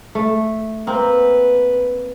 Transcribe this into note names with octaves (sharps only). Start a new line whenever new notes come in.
A3
A#3 C4 B4